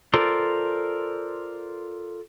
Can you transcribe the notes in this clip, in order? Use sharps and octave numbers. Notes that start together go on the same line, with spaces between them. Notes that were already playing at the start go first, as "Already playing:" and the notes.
F4 A4 A#4 C5 D5